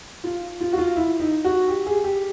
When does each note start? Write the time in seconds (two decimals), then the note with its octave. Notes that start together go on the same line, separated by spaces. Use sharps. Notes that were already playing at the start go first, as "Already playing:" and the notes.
0.24 F4
0.61 F4
0.73 F#4
0.78 F4
0.96 E4
1.20 D#4
1.45 F#4
1.68 G4
1.86 G#4
2.04 G4